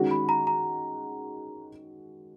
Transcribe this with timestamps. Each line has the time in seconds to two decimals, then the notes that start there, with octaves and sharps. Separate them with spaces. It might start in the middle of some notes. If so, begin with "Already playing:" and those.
Already playing: D#3 G#3 C#4 F#4
0.11 B5
0.29 A#5
0.47 A#5